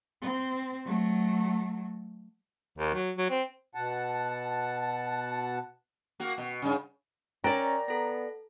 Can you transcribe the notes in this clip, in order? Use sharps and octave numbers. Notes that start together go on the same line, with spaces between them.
C4
F#3 A3
D#2
F#3
F#3
C4
B2 F#5 A5
A#3 F#4
B2
G2 C#3
C#4 A#4 D5 G5 A#5 F#6 A6
B3 A4 A#6